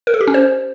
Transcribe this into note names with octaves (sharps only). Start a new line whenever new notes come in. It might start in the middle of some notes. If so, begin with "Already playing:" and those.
A#4
A4
G4
C#4
C5